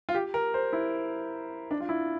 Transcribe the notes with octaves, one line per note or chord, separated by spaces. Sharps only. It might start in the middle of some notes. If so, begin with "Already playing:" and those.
F4
G4
A#4
C5
E4
D4
F4
E4